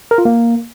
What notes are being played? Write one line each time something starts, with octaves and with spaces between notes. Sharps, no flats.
A#4
F4
A#3